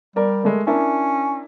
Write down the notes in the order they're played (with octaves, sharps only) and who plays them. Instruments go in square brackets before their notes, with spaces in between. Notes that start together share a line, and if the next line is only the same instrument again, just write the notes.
[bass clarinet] G3 [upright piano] A#4 D5
[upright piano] G#3 A3 A#4
[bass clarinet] C#4 [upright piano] D4 E4 A#4